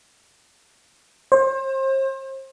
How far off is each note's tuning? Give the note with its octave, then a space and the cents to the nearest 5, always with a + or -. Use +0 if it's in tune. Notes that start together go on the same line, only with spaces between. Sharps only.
C5 +35